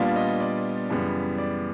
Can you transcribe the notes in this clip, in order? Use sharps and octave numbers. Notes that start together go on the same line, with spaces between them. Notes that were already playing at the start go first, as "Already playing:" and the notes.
Already playing: A#2 G3 B3 D4 F4
D#5
D5
F#2 C#3 E3 G3 B3
D5